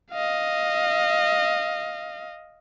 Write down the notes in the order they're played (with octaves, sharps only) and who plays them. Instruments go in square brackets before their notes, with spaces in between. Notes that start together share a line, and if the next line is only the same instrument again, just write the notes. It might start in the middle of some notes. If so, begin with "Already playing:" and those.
[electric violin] D#5 F5